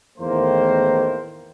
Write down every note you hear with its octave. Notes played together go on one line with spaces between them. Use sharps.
E2 A2 D#3 A#3 C5